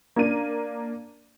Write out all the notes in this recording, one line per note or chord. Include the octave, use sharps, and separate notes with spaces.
A#3 D4 D#7